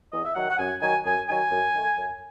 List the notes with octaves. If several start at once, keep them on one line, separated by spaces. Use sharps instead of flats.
E2 D#5
E5
D#3 F#3 F#5
F#5
F#2 G#5
D#3 F#3 G#5
F#2 G#5
D#3 F#3 G#5
F#2
D#3 A3
F#2